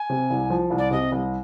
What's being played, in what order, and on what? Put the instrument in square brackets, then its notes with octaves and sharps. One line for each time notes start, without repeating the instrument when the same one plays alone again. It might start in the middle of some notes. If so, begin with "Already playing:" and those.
Already playing: [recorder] G#5
[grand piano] C3
C2
F3
C2
[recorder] D5
[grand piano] C3 [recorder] D#5
[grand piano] C2